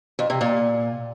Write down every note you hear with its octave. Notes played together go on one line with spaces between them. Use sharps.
F2
C3
A#2